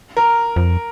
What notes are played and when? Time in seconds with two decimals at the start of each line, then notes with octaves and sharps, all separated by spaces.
0.17 A#4
0.56 F2